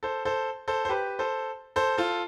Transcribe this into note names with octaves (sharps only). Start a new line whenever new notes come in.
A4 C5
A4 C5
A4 C5
C5
G4 B4
A4 C5
A4 C5
F4 A4